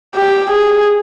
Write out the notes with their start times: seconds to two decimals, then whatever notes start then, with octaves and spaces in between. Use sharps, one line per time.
0.16 G4
0.51 G#4